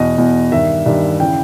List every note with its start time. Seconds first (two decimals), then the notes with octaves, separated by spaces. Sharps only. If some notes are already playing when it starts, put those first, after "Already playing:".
Already playing: E2 B2 D#5
0.17 E2 B2
0.52 G2 D#3 E5
0.86 G2 D#3
1.20 C#3 E3 G5